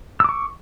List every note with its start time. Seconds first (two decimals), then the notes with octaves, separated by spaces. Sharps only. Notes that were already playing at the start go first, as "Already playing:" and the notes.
0.20 E6
0.24 D6
0.29 C#6